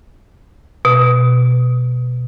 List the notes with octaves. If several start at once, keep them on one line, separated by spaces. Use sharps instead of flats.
B2